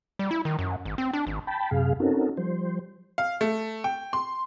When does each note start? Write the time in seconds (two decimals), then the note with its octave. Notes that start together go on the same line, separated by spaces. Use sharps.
0.19 G3
0.31 E4
0.45 D#3
0.59 F#2
0.85 G#1
0.98 C4
1.13 D4
1.27 G#1
1.47 G5 A5 B5
1.71 F#2 C3 G#4 F5
2.00 C4 C#4 D#4 F#4 A4 A#4
2.37 F3 G3 C5
3.18 F5
3.41 A3
3.84 G5
4.13 C6